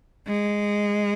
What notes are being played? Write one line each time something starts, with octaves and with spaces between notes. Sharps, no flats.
G#3